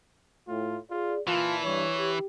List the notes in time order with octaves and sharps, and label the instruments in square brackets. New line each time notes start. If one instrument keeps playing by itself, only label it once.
[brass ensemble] A2 [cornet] F4
[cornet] F4 [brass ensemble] G#4 D5
[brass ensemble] A#2 A5 [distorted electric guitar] E3 [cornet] F4
[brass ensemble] G2 [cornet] C#5
[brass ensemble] G4